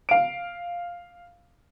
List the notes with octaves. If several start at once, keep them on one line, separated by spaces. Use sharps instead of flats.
F5 D7